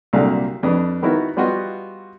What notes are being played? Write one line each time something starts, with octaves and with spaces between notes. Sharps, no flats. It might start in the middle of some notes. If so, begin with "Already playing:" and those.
C2 A#2 D3 F#3 G3 F5
F2 D4 B4 D#6
D#3 B3 D#4 E4 F#4 A#4
G3 B3 F4 F#4 D#5